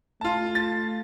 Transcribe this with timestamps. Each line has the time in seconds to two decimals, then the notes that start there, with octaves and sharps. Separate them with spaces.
0.21 A3 F4 A5
0.55 A6